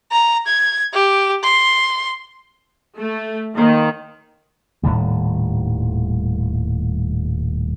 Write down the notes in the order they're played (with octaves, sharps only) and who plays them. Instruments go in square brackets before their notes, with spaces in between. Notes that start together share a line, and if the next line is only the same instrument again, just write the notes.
[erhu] A#5
G#6
G4
C6
[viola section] A3
[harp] D#2 A#3 C5 [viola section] D#3
[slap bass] D#1 A2 D#3 G3